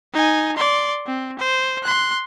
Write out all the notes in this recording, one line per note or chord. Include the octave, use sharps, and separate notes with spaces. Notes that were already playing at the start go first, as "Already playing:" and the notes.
D#4 G#5
D5 C6
C4
C5
C6 F#6